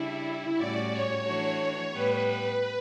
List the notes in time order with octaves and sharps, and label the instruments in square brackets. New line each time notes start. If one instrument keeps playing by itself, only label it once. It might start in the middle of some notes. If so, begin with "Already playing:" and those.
Already playing: [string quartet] C#3 G3 D4 [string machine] E4
[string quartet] A2 G3 C#4 F#4 [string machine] D5
[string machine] C#5
[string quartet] E3 A3 D4 F#4
[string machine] C#5
[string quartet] A2 G3 B3 [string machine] B4
[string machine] B4